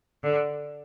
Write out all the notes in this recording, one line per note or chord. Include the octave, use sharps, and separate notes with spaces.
D3